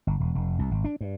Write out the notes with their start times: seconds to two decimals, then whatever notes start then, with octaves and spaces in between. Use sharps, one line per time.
0.07 G1
0.20 E1
0.35 F1
0.59 C2
0.71 G#1
0.84 D4
1.01 G2